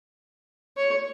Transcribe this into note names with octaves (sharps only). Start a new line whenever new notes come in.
C#5